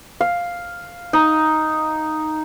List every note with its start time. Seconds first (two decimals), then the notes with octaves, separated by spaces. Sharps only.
0.21 F5
1.13 D#4